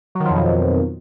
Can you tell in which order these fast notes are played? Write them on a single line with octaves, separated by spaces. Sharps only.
F#3 D#3 F3 F2 B2